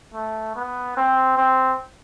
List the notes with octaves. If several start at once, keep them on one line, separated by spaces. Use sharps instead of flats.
A3
B3
C4
C4